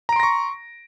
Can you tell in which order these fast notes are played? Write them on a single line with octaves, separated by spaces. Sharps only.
A#5 D7 C6 A#6 C#6